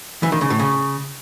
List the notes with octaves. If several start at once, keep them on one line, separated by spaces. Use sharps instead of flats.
E3
D#3
C#3
A2
C#3